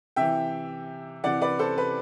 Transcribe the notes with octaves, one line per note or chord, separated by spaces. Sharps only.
C3 E3 E5 G5
C3 E3 D5 F#5
B4 D5
A4 C5
B4